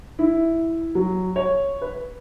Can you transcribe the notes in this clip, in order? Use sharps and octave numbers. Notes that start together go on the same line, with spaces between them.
E4
F#3
C#5
B4